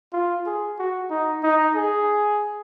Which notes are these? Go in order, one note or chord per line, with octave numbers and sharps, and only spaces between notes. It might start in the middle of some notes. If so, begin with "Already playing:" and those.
F4
G#4
F#4
D#4
D#4
G#4